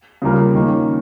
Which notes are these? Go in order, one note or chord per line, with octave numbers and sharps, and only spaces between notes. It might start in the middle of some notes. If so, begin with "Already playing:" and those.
C#3 G3 A#3 F4 A#4
D#3 A#3 C#4